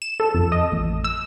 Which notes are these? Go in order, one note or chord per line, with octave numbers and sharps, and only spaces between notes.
E7
A4
F2
D#5
A1
E6